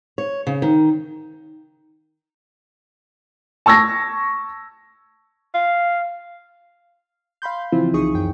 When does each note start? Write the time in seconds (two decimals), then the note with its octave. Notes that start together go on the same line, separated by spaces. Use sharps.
0.18 C#5
0.47 C#3
0.62 D#3
3.66 A5 C#6 E6 G#6 A#6
5.55 F5
7.42 F5 B5 C6 G6
7.72 C#3 E3 F3 C4 E4 F4
7.93 C2 C#3 D#4 G#4 C#6 D#6
8.14 C#2 F#2 G5